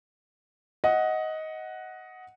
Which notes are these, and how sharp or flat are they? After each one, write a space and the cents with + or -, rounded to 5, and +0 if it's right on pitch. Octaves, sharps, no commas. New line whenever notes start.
D#5 +15 F#5 +0